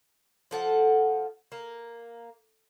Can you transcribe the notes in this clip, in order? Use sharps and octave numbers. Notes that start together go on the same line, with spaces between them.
F3 A4 F#5
A#3